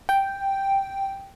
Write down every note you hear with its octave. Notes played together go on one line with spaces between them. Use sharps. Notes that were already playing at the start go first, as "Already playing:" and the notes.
G5